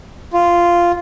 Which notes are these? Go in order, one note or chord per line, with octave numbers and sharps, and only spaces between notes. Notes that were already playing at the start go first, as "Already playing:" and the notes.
F4